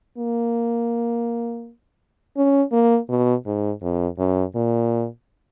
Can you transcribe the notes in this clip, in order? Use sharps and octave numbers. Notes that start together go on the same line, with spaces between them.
A#3
C#4
A#3
B2
G#2
F2
F#2
A#2